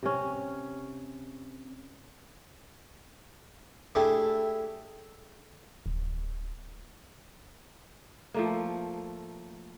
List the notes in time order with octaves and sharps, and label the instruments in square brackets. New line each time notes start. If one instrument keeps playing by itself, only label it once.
[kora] C3 C#4
[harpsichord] A3 D4 E4 G4 G#4
[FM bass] D1
[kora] F3 A3 A#3